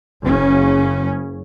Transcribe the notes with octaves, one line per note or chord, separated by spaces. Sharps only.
F#1 C#3 C#4